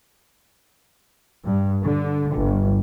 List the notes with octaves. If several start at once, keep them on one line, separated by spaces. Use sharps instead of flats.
G2
D3
G1